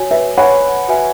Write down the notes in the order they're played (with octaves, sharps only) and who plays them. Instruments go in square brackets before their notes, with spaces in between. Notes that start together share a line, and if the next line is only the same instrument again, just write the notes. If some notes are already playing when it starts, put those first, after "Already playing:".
Already playing: [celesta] F#4 C#5 G#5
[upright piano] B4 E5
[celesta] B4 G#5 B5 [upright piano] C#5 F#5
[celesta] F#4 B4 E5 G#5